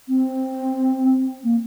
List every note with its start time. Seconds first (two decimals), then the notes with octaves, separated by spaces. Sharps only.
0.09 C4
1.44 A#3